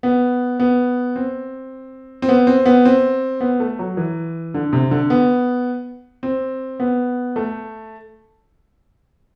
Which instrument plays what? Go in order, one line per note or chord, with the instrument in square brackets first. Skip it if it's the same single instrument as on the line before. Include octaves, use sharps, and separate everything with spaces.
[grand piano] B3
B3
C4
C4
B3
C4
B3
C4
B3
A3
F#3
E3
D3
C3
D3
B3
C4
B3
A3